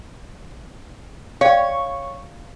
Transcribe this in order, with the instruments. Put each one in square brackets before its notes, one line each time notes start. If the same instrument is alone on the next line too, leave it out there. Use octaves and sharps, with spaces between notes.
[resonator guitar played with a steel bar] C#5 [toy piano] F5 G5